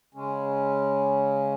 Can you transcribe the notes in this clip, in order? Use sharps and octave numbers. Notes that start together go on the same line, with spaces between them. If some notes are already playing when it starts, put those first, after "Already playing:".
C#3 G#3 C#4